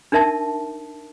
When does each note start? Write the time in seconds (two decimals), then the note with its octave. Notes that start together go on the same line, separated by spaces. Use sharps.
0.12 D4 D#4 A#4 E5 A5